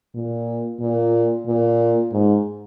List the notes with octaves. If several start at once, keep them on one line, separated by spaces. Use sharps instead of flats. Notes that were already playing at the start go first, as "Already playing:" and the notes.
A#2
A#2
A#2
G#2